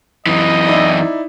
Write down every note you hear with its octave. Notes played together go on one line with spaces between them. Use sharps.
F#2 E3 D#5
D#4 E4 D5